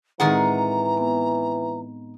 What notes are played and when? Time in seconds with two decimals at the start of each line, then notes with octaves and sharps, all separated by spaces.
0.20 A2 D#3 E3 G#3 C4 G#4 F#5 A#5
0.97 B3